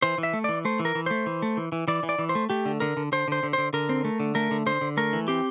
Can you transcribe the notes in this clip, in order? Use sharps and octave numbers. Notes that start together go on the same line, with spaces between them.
E3 C5
E3
E5
A3
E3 D5
A3 C5
E3
A#4
E3
A3 C5
E3
A3
E3
E3
E3 D5
E3
D5
E3
C5
A3
A3 G4
D3
D3 A#4
D3
D3 C5
D3 C5
D3
D3 C5
D3 A#4
C4
A3
D3
A3 A#4
D3
D3 C5
D3
A3 A#4
E3
C4 G4